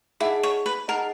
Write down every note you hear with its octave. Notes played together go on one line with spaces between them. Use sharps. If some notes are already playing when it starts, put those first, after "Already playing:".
D#4 E4 G#4 D#5 F#5
C#5
B4
D#4 G#4 A#4 D#5 F#5